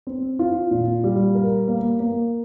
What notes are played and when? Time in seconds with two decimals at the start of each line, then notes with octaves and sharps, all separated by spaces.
0.07 C4
0.39 F4
0.71 A#2
1.04 G3
1.35 A#4
1.68 A#3
2.00 A#3